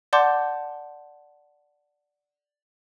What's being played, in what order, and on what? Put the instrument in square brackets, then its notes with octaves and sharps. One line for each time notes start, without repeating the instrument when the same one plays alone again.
[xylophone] D5 F#5 A5 C6 D6 G6